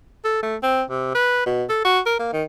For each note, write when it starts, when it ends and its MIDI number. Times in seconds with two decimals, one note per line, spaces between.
0.25 0.42 69
0.43 0.56 57
0.63 0.83 60
0.90 1.14 48
1.15 1.43 71
1.46 1.64 47
1.69 1.80 69
1.85 2.00 66
2.06 2.17 70
2.19 2.30 58
2.33 2.44 51